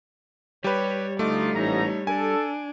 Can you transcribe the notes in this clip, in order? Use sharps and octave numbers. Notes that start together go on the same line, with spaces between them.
G3 G4 B4 C#5
D2 A3 D#4 F4 D6
A1 G#2 D#4 C#5 A#5
D4 A4 G#5 D7